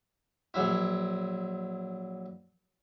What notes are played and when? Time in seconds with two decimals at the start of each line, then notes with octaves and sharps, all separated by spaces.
0.54 A#1 F#3 E4